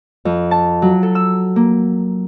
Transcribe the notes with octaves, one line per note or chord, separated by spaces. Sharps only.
F2
A5
F#3
A4
E6
A#3